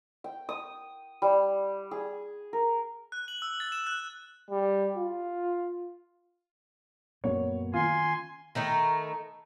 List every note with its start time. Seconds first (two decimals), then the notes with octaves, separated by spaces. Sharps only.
0.24 G5
0.49 D#6
1.22 G3
1.91 G#4
2.53 A#4
3.12 F#6
3.28 F#7
3.42 E6
3.60 A6
3.72 E7
3.87 F#6
4.50 G3
4.97 F4
7.24 F#2 A#2 F#3 A#3 B3 C#5
7.74 D#3 C#4 F4 G#5 C6
8.55 D#3 A3 D#4 A#5 B5